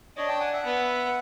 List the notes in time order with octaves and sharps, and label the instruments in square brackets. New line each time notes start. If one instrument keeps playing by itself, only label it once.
[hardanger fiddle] D4 [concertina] C#5 D#5
[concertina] G5 A5
F#5 G#5
E5 F#5
[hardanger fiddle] B3